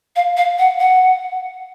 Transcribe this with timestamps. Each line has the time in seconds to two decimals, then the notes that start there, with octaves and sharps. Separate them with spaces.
0.16 F5
0.37 F5
0.59 F#5
0.80 F#5